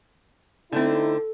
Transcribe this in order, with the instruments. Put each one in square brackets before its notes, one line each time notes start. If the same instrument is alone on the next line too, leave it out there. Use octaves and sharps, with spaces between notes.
[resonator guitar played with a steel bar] D3 A3 C4 [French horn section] D#4 E4 [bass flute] A4